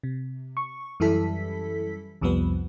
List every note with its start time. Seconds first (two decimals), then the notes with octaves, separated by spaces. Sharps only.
0.04 C3
0.57 C#6
1.00 F#2 E3 G3 E4 A4 B6
2.21 C2 F2 F3 G3 B3 B4